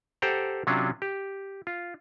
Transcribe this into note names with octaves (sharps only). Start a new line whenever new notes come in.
G4 A4 C5 F#5 G5 A#5
C3 F#3 C#4 D4 F4
G4
F4